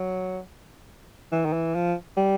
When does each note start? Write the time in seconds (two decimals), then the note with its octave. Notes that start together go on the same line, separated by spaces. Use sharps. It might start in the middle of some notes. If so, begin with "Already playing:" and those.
Already playing: F#3
1.32 E3
1.45 D#3
1.53 E3
1.75 F3
2.17 G3